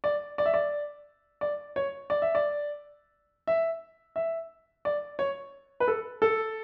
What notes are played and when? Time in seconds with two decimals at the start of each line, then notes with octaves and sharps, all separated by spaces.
0.04 D5
0.38 D5
0.46 E5
0.54 D5
1.41 D5
1.76 C#5
2.10 D5
2.22 E5
2.35 D5
3.47 E5
4.16 E5
4.85 D5
5.19 C#5
5.80 B4
5.88 A4
6.22 A4